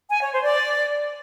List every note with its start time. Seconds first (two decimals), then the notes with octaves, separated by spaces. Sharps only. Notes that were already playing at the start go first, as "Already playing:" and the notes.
0.11 G#5
0.21 C#5
0.32 C5
0.43 D5